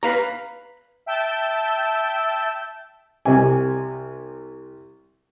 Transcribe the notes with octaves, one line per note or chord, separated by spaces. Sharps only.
B4 F5 A#5
E5 G5 A5 E6 G6
C2 C3 G#5